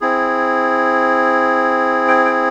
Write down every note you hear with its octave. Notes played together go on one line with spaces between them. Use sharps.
C4 E4 G#4
G5
G5